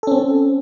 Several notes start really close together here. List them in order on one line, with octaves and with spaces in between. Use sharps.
A4 C#4 C4